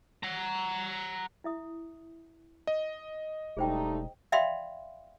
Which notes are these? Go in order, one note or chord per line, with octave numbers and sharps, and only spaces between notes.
F#5 A#5
E4 E5 D#6
D#5
E1 G3 A3 D#4 G#4 C5 G5
D5 E5 F5 G5 B5 C6